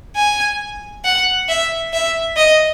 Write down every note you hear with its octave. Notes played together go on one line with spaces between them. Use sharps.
G#5
F#5
E5
E5
D#5